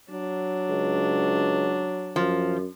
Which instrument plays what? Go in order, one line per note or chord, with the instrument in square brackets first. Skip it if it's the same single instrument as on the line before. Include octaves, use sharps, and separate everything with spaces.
[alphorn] F#3 [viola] D4
[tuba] C#2
[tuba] F#2 [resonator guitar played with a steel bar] F3